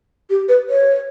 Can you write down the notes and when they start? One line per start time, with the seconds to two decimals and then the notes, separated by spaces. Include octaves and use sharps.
0.30 G4
0.49 B4
0.70 C#5